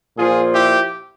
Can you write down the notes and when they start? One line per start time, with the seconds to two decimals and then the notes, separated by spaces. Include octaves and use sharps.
0.17 A#2 F3 F4 G#4
0.55 E4 G4